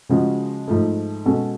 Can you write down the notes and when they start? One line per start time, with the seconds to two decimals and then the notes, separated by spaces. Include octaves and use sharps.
0.09 C#3 F3 G#3 C#4 F#4
0.68 G#2 F3 A3
1.26 B2 G#3 C#4 F#4 A4